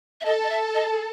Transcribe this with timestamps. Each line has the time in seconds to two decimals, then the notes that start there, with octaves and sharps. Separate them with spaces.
0.21 E5
0.25 A4 D#5
0.44 D#5
0.50 E5
0.74 D#5